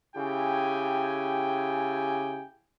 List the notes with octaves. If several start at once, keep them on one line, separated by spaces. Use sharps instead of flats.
C#3 E4 G4 G5 G#5